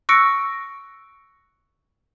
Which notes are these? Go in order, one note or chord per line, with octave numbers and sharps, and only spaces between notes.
C#6 E6 F#6 A#6 C#7 D7